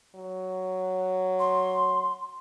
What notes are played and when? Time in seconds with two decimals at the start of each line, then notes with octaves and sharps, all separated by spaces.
0.15 F#3
1.39 C6